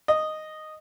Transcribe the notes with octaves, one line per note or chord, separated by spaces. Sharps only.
D#5